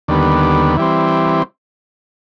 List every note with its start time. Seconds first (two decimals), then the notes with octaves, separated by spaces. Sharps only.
0.08 D#2 D3 G3 B3
0.77 E3 G3 C4